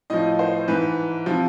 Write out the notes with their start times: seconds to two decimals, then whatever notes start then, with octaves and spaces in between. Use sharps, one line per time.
0.10 A2 F3 D#5
0.39 C5
0.68 G#2 E3 B4
1.26 C3 F3